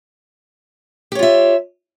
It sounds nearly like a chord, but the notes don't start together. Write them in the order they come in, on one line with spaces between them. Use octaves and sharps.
G4 C#5 F4 E5